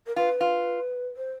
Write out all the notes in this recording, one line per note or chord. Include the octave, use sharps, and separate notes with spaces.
A#4
F4 B4
F4
C5